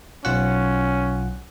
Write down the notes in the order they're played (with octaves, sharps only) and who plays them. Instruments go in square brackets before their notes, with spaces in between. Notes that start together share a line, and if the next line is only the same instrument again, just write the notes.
[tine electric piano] B1 F4 F#5 [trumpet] C#4